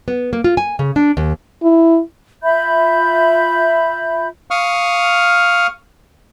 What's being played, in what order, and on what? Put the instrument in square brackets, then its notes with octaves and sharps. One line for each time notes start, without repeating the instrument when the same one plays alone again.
[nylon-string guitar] B3
A#3
F4
G#5
C#3
D4
D#2
[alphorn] E4
[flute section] F4 E5 B5 G6
[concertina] F5 C#6 D#6 F6